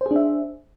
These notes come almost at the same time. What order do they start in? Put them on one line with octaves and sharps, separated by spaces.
C5 G#4 D4 E5